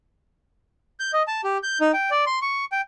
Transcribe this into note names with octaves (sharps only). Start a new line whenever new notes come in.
G6
D#5
A5
G4
G6
D#4
G5
D5
C6
C#6
G5